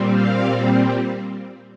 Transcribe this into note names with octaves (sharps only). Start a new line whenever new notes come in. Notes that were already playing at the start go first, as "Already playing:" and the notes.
Already playing: A#2 G3 C4
F5